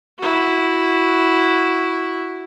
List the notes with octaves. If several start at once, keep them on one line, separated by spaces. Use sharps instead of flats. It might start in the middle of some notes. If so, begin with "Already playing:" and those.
E4 F#4